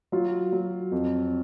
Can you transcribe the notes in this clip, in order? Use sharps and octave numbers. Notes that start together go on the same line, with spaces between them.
F#3 F4
F#3
F2